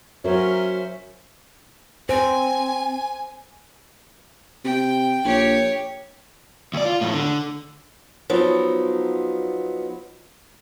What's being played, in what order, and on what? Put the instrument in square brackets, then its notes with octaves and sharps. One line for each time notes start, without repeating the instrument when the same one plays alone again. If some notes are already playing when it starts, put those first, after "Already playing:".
[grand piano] F#3 [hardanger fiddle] C#4 C5 [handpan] F#4 A#4 C#5 [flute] E5
[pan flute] C4 [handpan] C5 [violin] G#5
[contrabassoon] C3 [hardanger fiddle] G5
[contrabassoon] A#1 [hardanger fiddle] G4 C#5
[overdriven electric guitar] D2 D5
F4
E2 A2
D3
[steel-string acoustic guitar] F3 F#3 B3 D#4